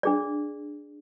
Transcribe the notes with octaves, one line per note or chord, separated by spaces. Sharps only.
D4 G#4 D5